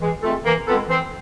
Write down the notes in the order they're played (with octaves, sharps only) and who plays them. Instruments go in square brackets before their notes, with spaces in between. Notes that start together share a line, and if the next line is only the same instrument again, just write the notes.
[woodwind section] E3 [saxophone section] G#3
[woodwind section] G#3 C4 F4 A4 [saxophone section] A3
[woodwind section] E3 [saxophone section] A#3
[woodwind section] G#3 C4 F4 A4 [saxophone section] B3
[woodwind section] E3 [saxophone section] C4